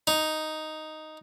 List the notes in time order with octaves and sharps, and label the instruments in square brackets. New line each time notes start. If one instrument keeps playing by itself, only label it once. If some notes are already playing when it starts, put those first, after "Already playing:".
[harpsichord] D#4